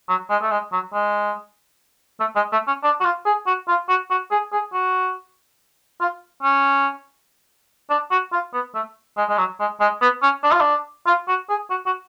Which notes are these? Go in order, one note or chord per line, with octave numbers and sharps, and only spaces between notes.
F#3
G#3
A3
G#3
F#3
G#3
A3
G#3
A3
C#4
D4
F#4
F4
G#4
F#4
F4
F#4
F#4
G#4
G#4
F#4
F4
C#4
D4
F#4
F4
B3
A3
G#3
G#3
F#3
G#3
G#3
B3
C#4
D4
F4
D4
F4
F#4
G#4
F#4
F#4